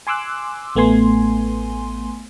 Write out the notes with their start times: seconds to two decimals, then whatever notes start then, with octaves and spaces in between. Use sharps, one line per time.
0.07 G#5 C6 D6 E6 F#6
0.76 A1 A3 B3 G#5 C6